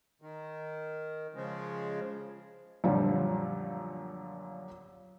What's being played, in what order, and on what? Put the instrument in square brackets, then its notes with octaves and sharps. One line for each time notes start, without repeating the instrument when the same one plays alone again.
[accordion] D#3
C#3 F3 G#3
[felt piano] F#2 A#2 D3 F3 G3